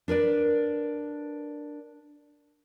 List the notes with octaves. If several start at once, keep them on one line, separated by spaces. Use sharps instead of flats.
D4 A#4 B4 D5